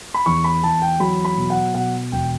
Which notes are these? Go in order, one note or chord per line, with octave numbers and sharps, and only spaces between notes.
B5
E2 C#6
B5
E2 A5
G5
F#3 B5
B5
B2
F#5
B2 F#5
E1 G5